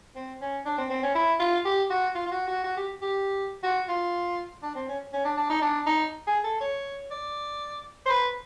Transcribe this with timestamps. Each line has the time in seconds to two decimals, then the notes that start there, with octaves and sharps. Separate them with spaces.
0.16 C4
0.41 C#4
0.66 D4
0.78 C4
0.90 C4
1.03 C#4
1.15 E4
1.40 F4
1.65 G4
1.90 F#4
2.15 F4
2.26 F4
2.31 F#4
2.48 F#4
2.64 F#4
2.77 G4
3.02 G4
3.64 F#4
3.88 F4
4.63 D4
4.75 C4
4.88 C#4
5.13 C#4
5.25 D4
5.37 D4
5.50 D#4
5.62 D4
5.87 D#4
6.28 G#4
6.44 A4
6.61 C#5
7.11 D5
8.06 C5
8.09 B4